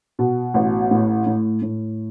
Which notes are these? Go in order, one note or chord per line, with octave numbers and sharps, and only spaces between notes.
B2
A1
A2
A2
A2